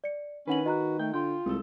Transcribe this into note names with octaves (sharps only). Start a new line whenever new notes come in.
D5 C#7
D#3 C#4 D4 B4 F#5 G#5 F#7
F#4 D#5 A#5 F#6
A3 G5
D3 F4 G5 C6 G6
C2 G#3 A4